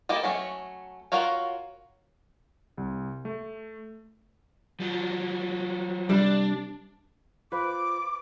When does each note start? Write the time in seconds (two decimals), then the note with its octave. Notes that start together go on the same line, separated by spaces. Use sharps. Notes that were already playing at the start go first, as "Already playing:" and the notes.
0.09 A#3 E4 G4 A4 D#5
0.23 F#3 A3 C#4
1.12 F4 F#4 A#4 C#5 F5
2.77 C2
3.25 A3
4.80 F3 F#3
6.09 C2 G3 D4
7.52 F4 B4 C5 F5 D6